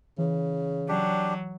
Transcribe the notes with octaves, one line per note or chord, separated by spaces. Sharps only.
C#3 E3
F#3 D4 G4